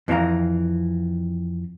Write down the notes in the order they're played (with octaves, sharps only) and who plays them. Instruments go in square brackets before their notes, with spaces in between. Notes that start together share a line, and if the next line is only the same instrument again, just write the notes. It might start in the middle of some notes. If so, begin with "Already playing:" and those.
[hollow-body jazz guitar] F2 E3 C4 C#4 F5 A#5